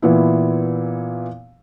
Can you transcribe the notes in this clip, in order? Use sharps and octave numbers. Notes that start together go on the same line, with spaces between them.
A#2 E3 B3 E4